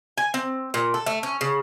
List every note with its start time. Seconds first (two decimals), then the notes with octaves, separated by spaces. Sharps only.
0.18 G#5
0.34 C4
0.74 A#2
0.94 A4
1.06 A3
1.23 C#4
1.41 C#3